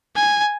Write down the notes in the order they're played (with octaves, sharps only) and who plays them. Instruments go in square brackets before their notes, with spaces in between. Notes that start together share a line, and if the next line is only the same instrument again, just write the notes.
[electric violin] G#5